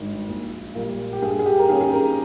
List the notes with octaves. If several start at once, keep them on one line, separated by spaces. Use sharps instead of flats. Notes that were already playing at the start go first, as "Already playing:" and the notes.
Already playing: G#1 G2 D#3
A#1
A#2 G3 A#3
G4
G2 G#4
G#4
G4
A#4
D#3 A#3 C#4 G#4
G#4
A#4